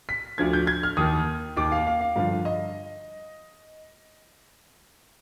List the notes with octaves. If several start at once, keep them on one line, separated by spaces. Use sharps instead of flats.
B6
D2 D3 F3 G#6
G6
G#6
F6
D#2 D#3 D#6
D#2 D#3 D6
F5
F5
F5
G2 D3 F3 F5
D#5